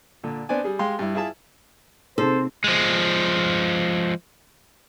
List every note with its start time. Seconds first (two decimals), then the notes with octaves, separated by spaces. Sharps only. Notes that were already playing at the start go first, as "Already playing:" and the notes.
0.24 A#2 D3
0.49 B3 C4 D4 D5 G#5
0.64 G3 G#4
0.79 G#3 G4 F5 G5 C6
0.99 G2 E4
1.15 E4 F4 G#4 E5 A5
2.18 C3 A#3 C4 D#4 G#4 A4 C5
2.64 F3 G#3